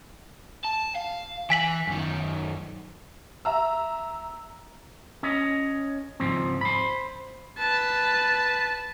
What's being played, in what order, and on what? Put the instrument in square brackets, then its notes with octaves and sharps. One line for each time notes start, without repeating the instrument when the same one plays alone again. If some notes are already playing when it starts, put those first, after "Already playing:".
[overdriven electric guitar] A5
F5
[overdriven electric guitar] E3 [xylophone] G#5 B6 F#7
[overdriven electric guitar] F#2 D#3
[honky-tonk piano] E5 A#5 E6
[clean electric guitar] C#4 C#5 D#5
C#2 G#2 F3 C4
C5 B5
[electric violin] B4 A5